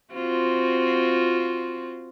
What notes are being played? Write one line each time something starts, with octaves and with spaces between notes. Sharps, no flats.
C4 F4 F#4